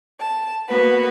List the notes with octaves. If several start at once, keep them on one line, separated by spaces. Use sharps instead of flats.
A5
A#3 B3 F#4 B4